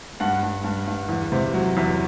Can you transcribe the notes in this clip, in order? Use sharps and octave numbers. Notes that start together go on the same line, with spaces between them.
G2 F#5
G2
G2
G2
E2
C3
F#3
E2